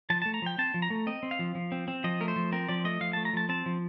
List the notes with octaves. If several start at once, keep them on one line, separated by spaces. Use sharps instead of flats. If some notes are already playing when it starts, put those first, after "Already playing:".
F3 A5
A3 A5
A#5
F3 G5
C4 A5
F3
A#5
A3
C4 D#5
C4
F5
F3
F3
C4
C4
F3 D#5
A3 A#4
C5
F3
C4 A#4
F3 D5
A3 D#5
F3 F5
A3 A5
A#5
F3 A5
C4 A5
F3